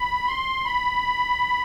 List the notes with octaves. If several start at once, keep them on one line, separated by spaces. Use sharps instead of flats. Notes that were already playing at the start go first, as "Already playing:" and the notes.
Already playing: B5
C6
B5